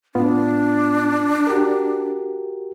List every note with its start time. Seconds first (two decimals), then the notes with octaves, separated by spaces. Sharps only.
0.15 A2 B3 D4 F4
1.47 F#4 G4 A#4